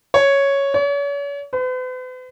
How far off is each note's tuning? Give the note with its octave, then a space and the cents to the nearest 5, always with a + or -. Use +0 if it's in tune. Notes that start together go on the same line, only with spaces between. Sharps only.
C#5 +0
C#5 +40
B4 +45